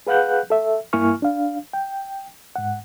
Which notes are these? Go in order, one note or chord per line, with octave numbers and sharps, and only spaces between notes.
G#4 B4 F5 F#5 F#6 G6
A4 E5
G2 A#3 E4 G#5 C#6 F6
D4 F5
G5
G#2 F#5